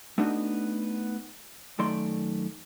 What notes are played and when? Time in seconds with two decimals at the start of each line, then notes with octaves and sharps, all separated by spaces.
0.18 A3 B3 D4 D#4 F#4
1.79 F#2 D#3 A3 D5 C6